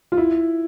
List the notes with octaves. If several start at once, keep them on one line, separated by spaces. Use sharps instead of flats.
F4
E4